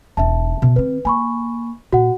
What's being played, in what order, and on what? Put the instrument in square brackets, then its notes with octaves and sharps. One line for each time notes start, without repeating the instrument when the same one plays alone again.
[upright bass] E1 D#4 [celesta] E5 A5
[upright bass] B2
[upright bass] D#3 C4 [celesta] B4
[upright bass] A#3 [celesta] G#5 B5 C#6
[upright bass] A#2 [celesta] F#4 F#5